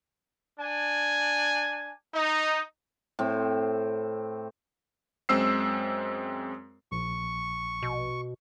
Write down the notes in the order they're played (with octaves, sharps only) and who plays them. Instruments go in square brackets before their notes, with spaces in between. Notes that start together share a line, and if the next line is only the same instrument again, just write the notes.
[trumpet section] D4 G#5
D#4
[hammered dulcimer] A2 C4
[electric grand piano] F#2 G#3 C4 E6 C7
[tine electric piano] A#1 [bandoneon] C#6
[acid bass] B2